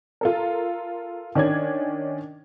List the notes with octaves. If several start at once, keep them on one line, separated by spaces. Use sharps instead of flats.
F4 A4 A#4
D#3 C#4 D4 G#6